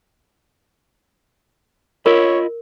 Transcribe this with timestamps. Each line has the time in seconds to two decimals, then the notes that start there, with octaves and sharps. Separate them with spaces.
2.06 F4 A#4 C#5 D#5 B5